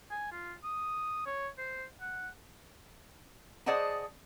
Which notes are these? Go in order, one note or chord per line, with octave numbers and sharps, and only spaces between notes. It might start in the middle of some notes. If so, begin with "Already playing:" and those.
G#5
F4
D#6
C#5
C5
F#5
G#4 C5 D5 D#5 F#5 A5